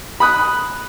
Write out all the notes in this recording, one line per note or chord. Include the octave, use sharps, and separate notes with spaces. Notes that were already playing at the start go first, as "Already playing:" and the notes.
B5 D#6 F#6